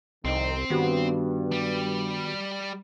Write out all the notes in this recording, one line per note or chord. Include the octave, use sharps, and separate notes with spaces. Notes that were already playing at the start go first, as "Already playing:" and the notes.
C2 F2 D#3 C4 D#4
G2 D#3 B3 F#4 G4
G3